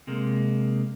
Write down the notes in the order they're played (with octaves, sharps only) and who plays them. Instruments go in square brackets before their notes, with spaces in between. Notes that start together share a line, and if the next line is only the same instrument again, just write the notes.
[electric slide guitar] C3 G#3 A#3